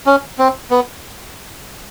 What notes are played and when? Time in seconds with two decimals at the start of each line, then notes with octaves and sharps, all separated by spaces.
0.06 C#4
0.39 C4
0.71 B3